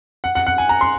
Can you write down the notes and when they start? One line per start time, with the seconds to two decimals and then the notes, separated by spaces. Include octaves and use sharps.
0.24 F#5
0.35 F#5
0.47 F#5
0.58 G#5
0.69 A#5
0.81 C6